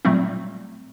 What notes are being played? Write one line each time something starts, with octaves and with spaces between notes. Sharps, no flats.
A#2 F#3 G3 A3 C4